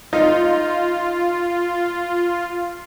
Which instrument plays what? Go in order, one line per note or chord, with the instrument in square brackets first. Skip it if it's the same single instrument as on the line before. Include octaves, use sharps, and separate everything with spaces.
[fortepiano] D#4 [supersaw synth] F4